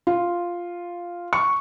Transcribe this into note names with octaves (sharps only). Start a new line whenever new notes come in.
F4
C#6